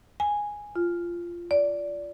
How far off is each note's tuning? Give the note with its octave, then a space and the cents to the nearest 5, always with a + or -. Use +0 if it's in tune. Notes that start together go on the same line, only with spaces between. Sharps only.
G#5 -5
F4 -15
D5 -15